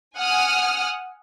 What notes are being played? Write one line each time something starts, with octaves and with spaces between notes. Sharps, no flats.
F#5 G#5 D#6 F6